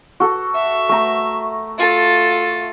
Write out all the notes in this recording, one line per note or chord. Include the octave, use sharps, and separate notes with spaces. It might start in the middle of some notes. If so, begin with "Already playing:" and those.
F#4 A4
E5
A3 A#5
F4 A4